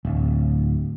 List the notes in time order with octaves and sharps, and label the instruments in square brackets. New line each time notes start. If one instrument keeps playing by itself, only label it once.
[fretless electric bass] D1